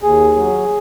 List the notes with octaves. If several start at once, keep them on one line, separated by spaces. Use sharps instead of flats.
D#2 G#4
F#3